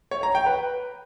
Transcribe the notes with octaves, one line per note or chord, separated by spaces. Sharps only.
C#5
A#5
G5
B4